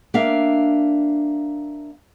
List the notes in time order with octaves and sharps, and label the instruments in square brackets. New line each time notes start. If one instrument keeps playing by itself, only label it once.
[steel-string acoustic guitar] A#3 D4 E5 F5